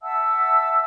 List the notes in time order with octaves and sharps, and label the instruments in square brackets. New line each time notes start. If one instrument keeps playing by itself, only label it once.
[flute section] E5 F#5 A5 E6